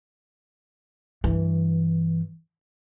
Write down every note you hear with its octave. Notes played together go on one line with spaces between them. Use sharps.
G2 E3